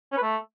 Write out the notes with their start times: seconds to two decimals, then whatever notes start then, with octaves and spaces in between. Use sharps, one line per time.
0.12 C#4
0.17 B4
0.23 A3